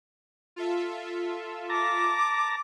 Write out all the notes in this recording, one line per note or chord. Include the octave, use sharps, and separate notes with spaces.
F4 A4 E5
A5 A#5 D6